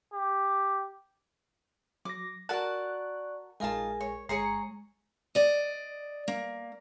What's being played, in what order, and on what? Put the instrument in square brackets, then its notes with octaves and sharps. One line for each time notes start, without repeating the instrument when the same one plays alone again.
[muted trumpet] G4
[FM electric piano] F#3 A#6 [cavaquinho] D6
[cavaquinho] F#4 A#4 A5 [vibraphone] D5 C#6 [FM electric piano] F#6
[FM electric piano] A#1 G#3 [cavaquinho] D#4 F4 A5 [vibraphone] G#4 A#4 G#5
[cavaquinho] C#5
[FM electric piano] G1 C#7 [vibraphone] G#3 [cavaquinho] G#4 C#5 A#5
[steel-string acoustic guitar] D5 D#5
A#3